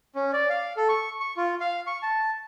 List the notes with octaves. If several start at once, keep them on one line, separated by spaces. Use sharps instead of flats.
C#4
D5
F5
A4
C#6
C#6
F4
F5
C#6
A5